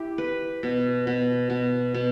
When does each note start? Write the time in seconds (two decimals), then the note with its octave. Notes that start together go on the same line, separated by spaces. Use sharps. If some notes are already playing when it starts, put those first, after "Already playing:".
Already playing: E4 G4
0.18 B4
0.63 B2
1.07 B2
1.50 B2
1.94 B2